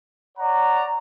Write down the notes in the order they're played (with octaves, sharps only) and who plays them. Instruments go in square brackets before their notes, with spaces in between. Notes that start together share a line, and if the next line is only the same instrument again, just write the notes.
[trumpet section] C#5 D5 F#5 A#5